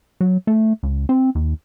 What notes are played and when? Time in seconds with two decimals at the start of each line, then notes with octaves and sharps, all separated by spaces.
0.21 F#3
0.47 A3
0.83 C#2
1.09 C4
1.35 D#2